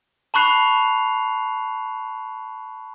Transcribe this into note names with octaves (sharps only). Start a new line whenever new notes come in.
A5 B5 C#6 F#6 C7 F7